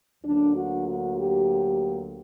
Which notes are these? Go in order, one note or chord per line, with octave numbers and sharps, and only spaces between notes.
D2 D3 F#3 A#3 D4
F#4
F#4
G4